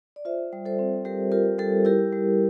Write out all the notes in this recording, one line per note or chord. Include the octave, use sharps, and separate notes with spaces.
D5
F4 C5 E5
G3
A4 C5
C4
G3 G4 A#4
F4 G4 A#4
G3 A4
E4 G4 A#4
G3